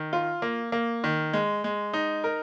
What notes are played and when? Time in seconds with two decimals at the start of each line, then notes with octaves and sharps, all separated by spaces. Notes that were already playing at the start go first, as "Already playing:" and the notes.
Already playing: D#3
0.13 F4
0.42 A#3
0.72 A#3
1.04 D#3
1.33 G#3
1.64 G#3
1.93 D#4
2.24 A#4